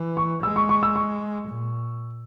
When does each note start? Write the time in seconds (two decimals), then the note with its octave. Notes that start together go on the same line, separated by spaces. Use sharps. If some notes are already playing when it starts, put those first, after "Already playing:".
Already playing: E3
0.17 C#6
0.43 G#3 E6
0.56 C#6
0.69 C#6
0.83 E6
0.96 C#6
1.49 A#2